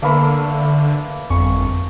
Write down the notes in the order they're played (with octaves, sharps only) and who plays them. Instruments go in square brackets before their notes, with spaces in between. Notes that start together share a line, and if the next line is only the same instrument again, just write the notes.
[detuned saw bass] D3 [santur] A3 A#3 B4
[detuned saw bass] G1 [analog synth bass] F2 [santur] C#6